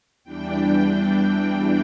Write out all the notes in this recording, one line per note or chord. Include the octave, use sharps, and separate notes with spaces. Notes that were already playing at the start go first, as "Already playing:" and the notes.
E2 E3 G3 D4 G5
G5